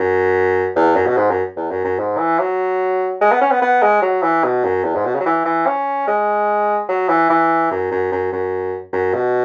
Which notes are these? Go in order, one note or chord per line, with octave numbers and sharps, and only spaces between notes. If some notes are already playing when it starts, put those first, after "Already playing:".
Already playing: F#2
E2
F#2
B2
G#2
F#2
E2
F#2
F#2
G#2
E3
F#3
G#3
B3
C#4
B3
B3
G#3
F#3
E3
B2
F#2
E2
G#2
B2
C#3
F#3
E3
E3
C#4
G#3
F#3
E3
E3
F#2
F#2
F#2
F#2
F#2
B2